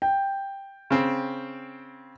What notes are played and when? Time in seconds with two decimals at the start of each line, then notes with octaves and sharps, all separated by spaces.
0.02 G5
0.91 C#3 C4